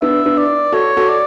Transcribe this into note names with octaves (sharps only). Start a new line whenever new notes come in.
B3 D4 E5
B3 D4
D5
F#4 A4 C#5
F#4 A4
D5